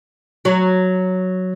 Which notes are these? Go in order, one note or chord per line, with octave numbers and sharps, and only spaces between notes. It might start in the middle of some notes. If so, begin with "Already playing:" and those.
F#3